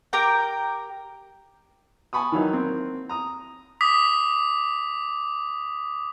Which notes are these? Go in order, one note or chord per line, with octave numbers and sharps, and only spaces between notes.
G4 A#4 G5 A#5
G#5 A5 B5 C#6 D#6
D#3 E3 F#3 D#4
A#3 C4
A#5 D#6
D6 D#6 B6